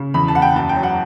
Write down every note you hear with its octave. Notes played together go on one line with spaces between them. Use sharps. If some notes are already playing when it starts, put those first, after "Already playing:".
Already playing: C#3
E2 B5
A5
E2 F#5
G5
F#2 A5
G5
F#3
F#5